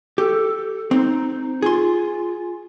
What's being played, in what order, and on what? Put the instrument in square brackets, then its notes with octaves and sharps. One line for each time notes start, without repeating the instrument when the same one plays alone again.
[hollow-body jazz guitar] G4 [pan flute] A4
[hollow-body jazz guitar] C4 [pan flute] D#4
[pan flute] F4 [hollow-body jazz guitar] G#4 C6